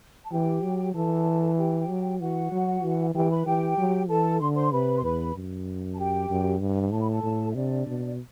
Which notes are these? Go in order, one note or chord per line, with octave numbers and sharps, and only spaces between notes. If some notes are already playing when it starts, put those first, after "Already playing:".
A5
E3 G4 G5
F#3
E3 A4 A5
G4 G5
F#3
E3 F#4 F#5
F#3
E3
E3 G4 G5
B4 B5
E3 G4 G5
F#3
E3 A4 A5
D3 C6
C5 C6
C3 B4 B5
C6
E2 B4 B5
F#2
A5
G4 G5
F#2
G2
A2 A5
B5
A4 A5
A2
E5
C3 D4 D5
B2